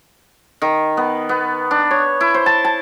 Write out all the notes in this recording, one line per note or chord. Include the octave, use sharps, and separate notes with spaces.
D#3
B3
B3
D4
C#5
E4
C5
A5
A5